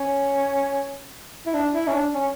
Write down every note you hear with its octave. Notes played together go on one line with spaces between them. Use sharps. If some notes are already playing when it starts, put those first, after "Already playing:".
Already playing: C#4
E4
D4
E4
C#4
D4
C#4